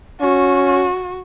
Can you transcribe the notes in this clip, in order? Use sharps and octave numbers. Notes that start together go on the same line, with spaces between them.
C#4 F#4